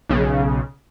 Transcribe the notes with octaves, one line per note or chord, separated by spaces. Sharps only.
B1 C#3